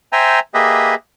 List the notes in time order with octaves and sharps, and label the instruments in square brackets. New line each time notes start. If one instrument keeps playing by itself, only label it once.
[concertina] C5 E5 G5 G#5 A#5
A#3 G4 G#4 B4 D#5 E5